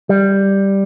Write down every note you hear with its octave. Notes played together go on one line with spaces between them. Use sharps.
G3